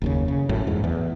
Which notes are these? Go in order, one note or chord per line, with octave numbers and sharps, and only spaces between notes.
F#1 D#2 C#3
C#3
A1 F#2 A2
E2 G#2
E2